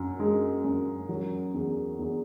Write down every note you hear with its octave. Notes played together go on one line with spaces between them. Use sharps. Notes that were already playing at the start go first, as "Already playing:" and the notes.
Already playing: F#2
G#3
F#2
F#3
E2
E2